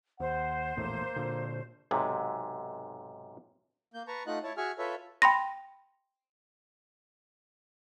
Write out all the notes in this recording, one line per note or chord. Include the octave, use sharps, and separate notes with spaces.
D#2 C5 F#5
A#1 E2 A2 A#3
A#2 D3
B1 G#2 C3
A#3 G6
B4 A5 A#5 C#6
A3 D#4 F4 D#5 F#5 F#6
E4 C#5 A5
F#4 G#4 E5 G#5 C#6 F6
F4 A4 B4 C#5 E5
G5 B5 C6 A#6